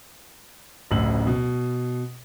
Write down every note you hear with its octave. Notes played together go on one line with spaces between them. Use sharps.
D1 A1 D2 C#3 E6 F#7
B2